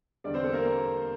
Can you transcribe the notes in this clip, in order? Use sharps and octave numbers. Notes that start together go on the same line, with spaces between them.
E2 D3 G3 D4 D5
C4 C5
A4
A#3 A#4